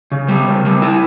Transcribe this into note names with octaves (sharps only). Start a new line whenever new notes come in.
C#3
G3
C#3
G3
E4